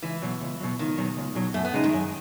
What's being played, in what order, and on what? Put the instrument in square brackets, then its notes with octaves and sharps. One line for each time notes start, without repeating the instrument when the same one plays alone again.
[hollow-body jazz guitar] C#2 [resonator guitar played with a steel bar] E3
[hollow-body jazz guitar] B2 F#3
C#2
B2 F#3
[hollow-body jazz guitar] C#2 [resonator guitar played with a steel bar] D#3
[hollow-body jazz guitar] B2 F#3
C#2
B2 F#3
[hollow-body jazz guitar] F#2 [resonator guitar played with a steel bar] A3
[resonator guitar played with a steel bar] B3
[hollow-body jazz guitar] C#3 G#3 D#4
[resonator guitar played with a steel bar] D#3
[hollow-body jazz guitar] F#2